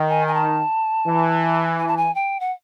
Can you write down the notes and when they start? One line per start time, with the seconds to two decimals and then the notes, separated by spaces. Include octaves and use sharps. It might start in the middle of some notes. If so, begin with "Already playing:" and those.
Already playing: D#3
0.09 G#5
0.28 G#5
0.34 A5
1.07 E3
1.79 G#5
1.88 A5
1.97 G#5
2.15 G5
2.40 F#5